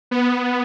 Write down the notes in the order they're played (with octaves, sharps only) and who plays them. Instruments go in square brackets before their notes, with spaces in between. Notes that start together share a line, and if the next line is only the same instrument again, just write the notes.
[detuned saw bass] B3